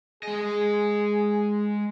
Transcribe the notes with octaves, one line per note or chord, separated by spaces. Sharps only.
G#3 G#4 D#5